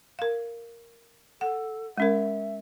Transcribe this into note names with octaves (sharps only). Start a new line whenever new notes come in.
A#4 F5
A4 F#5
G#3 C#4 A#4 E5